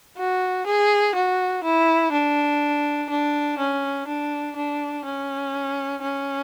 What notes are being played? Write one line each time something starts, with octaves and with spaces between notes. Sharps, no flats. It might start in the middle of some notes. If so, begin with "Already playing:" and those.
F#4
G#4
F#4
E4
D4
D4
C#4
D4
D4
C#4
C#4